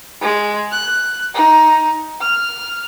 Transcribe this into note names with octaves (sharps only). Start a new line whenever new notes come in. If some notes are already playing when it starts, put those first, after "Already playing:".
G#3
F#6
D#4
F6